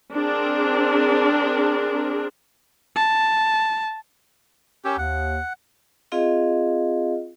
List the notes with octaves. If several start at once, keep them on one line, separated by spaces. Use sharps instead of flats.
C4 D4 G#4 A#4
A5
C#4 G4 A#4 G5 E6
D#2 F#5
C4 F4 G#4 D#5 F5